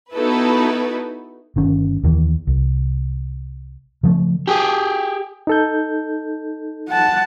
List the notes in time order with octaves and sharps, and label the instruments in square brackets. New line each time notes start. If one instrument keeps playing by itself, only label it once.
[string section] B3 D#4 E4 F#4 A4 B4
[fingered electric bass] G1 D#3 C#4
D#2 D#3 E3
C2
C#3 F3 G3 A3
[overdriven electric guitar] G4 G#4
[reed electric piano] D#4 A4 G6
[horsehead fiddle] F#5 A5